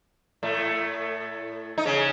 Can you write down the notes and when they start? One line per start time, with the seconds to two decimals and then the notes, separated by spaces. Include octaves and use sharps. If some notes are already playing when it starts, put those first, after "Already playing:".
0.43 A2 A3
1.78 D#4
1.85 C#3 C#4